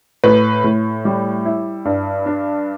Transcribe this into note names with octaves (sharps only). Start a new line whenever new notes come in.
A2 B4
A2
G3
E4
G2
D4